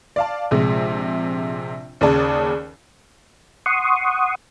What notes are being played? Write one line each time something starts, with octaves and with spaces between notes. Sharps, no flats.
D5 F5 A5
A#1 C3 G#3
D#2 C#3 G#4 D5 A5
F#5 C6 C#6 D#6